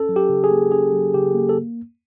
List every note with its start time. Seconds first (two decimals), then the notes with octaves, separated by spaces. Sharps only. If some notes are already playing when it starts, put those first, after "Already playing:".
Already playing: C#4 A4
0.09 F#3
0.16 G4
0.29 C#3
0.44 G#4
0.51 A#3
0.72 C#4 G#4
0.93 F#3
1.14 C#3 G4
1.35 A#3
1.49 A4